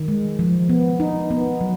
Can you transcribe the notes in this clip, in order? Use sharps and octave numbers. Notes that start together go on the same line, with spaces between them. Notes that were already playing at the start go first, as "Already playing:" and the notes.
Already playing: D#3
G#3
F3
B3
D#4
B3
F#3